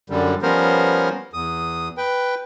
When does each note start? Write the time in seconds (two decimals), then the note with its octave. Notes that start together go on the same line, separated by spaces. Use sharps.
0.10 F#2 D3 G3
0.42 F3 G3 B3 C#4 A#4 C5
1.33 E2 D#6
1.97 B4 G5